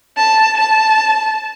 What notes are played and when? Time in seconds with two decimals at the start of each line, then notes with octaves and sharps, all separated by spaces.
0.17 A5
0.58 A5